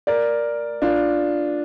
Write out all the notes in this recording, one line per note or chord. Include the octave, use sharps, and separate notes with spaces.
A#4 D5
D4 F4